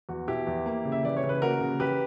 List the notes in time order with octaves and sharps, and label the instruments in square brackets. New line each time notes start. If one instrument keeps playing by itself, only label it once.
[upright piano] E2 F#4
B2 E4 G4
E2
A#3
C#3
E5
E3 D5
C#5
C#3
B4
A#3 F#4 A#4
C#3
E3 G4 B4